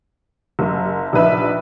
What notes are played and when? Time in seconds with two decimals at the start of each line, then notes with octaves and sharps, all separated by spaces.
0.59 F#1
1.13 A#1 D#4 B4 E5